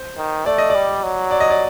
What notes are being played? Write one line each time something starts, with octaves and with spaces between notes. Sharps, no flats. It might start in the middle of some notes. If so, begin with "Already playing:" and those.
Already playing: C5
D#3
A3 D5
D#5
G3 D5
F#3
D5
D#5
D5